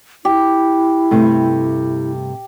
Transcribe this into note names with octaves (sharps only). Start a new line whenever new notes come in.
E4 G4
G2 C3 A3